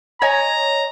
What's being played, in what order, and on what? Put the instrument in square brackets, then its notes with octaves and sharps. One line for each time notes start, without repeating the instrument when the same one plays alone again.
[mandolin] C#5 D#5 G#5 [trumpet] A#5